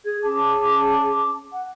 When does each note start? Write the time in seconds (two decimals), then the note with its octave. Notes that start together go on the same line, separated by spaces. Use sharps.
0.05 G#4 G#6
0.23 C#4 G#4 A5 D6
1.52 F#5